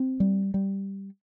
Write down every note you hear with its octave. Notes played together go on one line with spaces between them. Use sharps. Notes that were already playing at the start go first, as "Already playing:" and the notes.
Already playing: C4
G3
G3